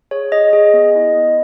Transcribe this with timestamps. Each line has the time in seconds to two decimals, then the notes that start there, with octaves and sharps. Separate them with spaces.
0.11 G#4 C#5
0.32 G#4 D#5
0.53 G#4
0.74 B3
0.95 E4
1.16 B3